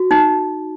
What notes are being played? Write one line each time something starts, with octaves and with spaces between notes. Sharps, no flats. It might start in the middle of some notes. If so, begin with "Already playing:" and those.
Already playing: F#4
D#4